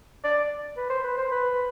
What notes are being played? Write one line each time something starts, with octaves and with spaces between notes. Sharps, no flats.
D5
B4
C5
B4
C5
B4